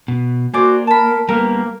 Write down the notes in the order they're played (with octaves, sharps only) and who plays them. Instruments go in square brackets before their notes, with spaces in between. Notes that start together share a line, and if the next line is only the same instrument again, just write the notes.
[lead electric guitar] B2
[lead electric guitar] A#3 [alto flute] F#4 [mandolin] G#4 C5 D5
[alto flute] A#4 [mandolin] A5 B5
[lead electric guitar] G3 B3 [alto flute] A#3 [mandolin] A#4 F6